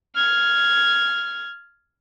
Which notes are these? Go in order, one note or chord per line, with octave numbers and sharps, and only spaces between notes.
F6 G#6